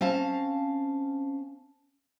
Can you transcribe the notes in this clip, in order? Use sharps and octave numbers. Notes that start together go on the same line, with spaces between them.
C4 C#4 F5 A5